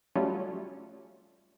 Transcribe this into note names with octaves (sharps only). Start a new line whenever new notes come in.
F#3 G3 A3 C#4 F4